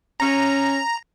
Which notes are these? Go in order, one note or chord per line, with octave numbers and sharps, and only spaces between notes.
C#4 A#5